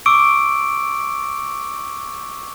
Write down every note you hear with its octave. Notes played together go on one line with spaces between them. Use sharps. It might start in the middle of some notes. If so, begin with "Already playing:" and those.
C#6 D6 E6 D7